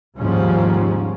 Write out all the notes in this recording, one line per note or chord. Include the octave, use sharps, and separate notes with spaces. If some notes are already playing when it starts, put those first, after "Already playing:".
D#2 G#2 C#3 F3 G3 C#4